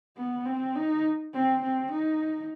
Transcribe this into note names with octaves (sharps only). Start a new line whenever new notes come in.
B3
C4
D#4
C4
C4
D#4